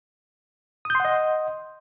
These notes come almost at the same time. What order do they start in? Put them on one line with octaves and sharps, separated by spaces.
D#6 G6 C6 F#5 D#5